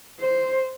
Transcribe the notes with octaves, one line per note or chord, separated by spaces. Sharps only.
C5